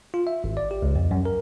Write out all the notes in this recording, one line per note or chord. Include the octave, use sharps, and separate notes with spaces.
F4
E5
G#1
D5
G4
C#2
F2
F#2
A#4